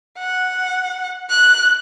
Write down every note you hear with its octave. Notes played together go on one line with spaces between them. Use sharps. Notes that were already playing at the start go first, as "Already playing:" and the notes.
F#5
F#6